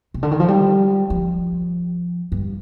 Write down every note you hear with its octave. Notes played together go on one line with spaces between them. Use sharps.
C3
D3
D#3
F3
G3
F3
G2